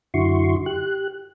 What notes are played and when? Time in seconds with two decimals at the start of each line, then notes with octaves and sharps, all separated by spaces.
0.14 F#2 D3 E4 F#4 C6 C#6
0.66 G4 F#6